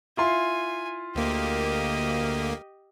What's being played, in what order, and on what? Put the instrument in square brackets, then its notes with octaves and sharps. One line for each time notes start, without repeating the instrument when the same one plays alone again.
[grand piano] E4 F4 C6 [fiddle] G#5
[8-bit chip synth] D2 A#3 [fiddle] G4 D#5